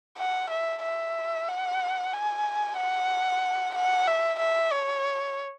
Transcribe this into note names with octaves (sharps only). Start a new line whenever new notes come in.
F#5
E5
E5
F#5
G#5
F#5
F#5
E5
E5
C#5